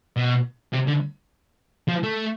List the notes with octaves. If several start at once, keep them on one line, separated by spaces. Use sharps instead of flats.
B2
C3
D3
F3
A3